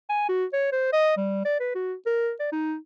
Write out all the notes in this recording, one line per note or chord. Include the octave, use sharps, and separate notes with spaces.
G#5
F#4
C#5
C5
D#5
G3
D5
B4
F#4
A#4
D5
D#4